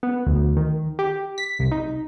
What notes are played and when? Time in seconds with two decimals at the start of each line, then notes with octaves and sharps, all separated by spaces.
0.03 B3
0.26 D2
0.57 D#3
0.99 G4
1.38 B6
1.59 C2
1.72 D#4